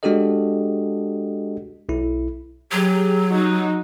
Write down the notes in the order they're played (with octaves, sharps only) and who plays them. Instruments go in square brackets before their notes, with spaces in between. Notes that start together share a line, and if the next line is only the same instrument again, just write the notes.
[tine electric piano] G#3 D4 F#4 G4 A4 D#5
B1 E4
[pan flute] F#3 [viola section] G4 G#4
[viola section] D#4 F#4